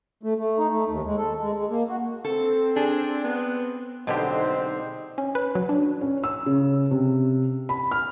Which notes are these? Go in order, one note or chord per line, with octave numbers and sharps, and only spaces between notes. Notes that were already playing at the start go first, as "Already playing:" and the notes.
A3
A3
D#4
A3
D#2
G#3
A4
G#3
G#3
A#3
F#4
C4 A4
D4 G#4
B3
B1 B2 D3 G#3 C4 D#4 G4 C5
C#4
B4
F#3
D4
C#4
E6
C#3
C3
B5
F6